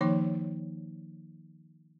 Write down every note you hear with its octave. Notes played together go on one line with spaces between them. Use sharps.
D#3 F3 A#3 D#4 C#5 D6